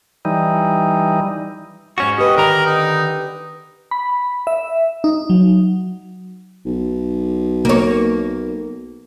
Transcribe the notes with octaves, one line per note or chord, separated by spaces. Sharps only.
E3 G3 D#4
G#2 C#4 F#4 C#6
G4 B4 D#5
D3 D#3 A#4 A#5
D#4
B5
E5
D#4
F#3
B1
A#3 C#5